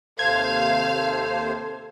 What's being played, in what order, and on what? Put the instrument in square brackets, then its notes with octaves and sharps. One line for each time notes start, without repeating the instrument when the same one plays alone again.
[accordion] D#2 C3 C5 [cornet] A4 [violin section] F5 [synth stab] G#6